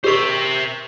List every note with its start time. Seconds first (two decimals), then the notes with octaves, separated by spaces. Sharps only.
0.04 G4 A#4 C5 E5 C#6